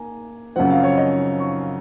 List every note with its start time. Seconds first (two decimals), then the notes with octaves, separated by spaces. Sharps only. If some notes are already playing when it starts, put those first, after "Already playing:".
Already playing: A#3 G#5 A#5
0.56 F#2 C#3 F3 C4 F#5
0.70 F5
0.83 C#5
0.97 D#5
1.39 C#6